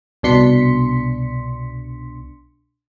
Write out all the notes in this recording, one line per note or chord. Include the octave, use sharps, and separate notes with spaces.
C2 B2 D4 C6 B6 C#7